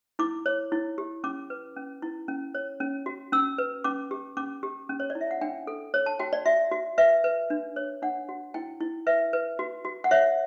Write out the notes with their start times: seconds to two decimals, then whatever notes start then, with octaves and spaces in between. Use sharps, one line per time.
0.19 E4 D6
0.46 C#5
0.72 E4
0.98 G4
1.24 C#4 D6
1.50 B4
1.76 C#4
2.02 E4
2.28 C#4
2.55 C#5
2.80 C#4
3.06 F#4
3.32 C#4 E6
3.58 B4
3.84 C#4 D6
4.11 G4
4.37 C#4 D6
4.63 G4
4.89 C#4
5.00 C#5
5.10 D5
5.15 E4
5.21 E5
5.31 F#5
5.41 D4 G5
5.67 A4
5.94 C#5
6.06 A5
6.19 F#4 G5
6.33 D5
6.45 F#4 E5
6.71 F#4
6.98 B4 E5
7.24 B4
7.50 D4
7.76 C#5
8.02 D4 F#5
8.29 F#4
8.54 E4 G5
8.80 E4
9.07 B4 E5
9.33 B4
9.59 F#4
9.85 F#4
10.04 F#5
10.11 C#5 E5